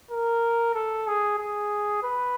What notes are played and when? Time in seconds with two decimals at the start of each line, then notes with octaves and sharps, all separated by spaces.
0.11 A#4
0.75 A4
1.07 G#4
1.39 G#4
2.03 B4